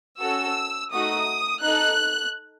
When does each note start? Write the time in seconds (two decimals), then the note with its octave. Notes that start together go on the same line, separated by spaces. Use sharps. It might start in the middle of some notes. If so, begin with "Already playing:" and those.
0.21 C#4 F#4 A4 E6
0.92 A3 D#4 F#4 D#6
1.63 D#4 A4 F#6